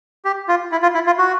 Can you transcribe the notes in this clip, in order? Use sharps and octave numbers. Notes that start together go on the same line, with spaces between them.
G4
F4
E4
F4
E4
F4
F#4